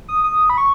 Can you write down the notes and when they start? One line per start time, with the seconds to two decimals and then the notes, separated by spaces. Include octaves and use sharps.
0.08 D#6
0.24 D#6
0.50 B5
0.58 C#6